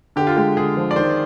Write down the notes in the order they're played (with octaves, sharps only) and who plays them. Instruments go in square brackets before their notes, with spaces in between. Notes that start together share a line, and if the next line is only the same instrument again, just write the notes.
[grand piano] D3 [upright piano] G4
[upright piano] F4
[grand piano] G#3 [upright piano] G4
[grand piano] D3 [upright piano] G#4
[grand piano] F3
[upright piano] D5
[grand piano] D#3 [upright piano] C5